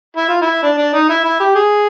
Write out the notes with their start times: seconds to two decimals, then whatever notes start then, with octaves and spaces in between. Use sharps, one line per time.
0.17 E4
0.29 F4
0.41 E4
0.63 D4
0.78 D4
0.94 D#4
1.09 E4
1.24 E4
1.40 G4
1.55 G#4